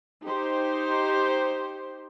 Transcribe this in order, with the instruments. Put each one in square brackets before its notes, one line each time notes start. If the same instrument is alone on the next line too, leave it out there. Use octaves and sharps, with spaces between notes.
[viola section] D#4 G4 C5